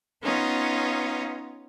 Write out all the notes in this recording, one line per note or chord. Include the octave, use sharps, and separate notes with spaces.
B3 C#4 D#4 F4